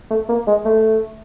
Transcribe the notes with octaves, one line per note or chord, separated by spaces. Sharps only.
A3
A#3
G#3
A3